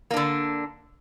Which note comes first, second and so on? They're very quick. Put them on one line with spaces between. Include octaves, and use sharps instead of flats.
A#3 D4 D3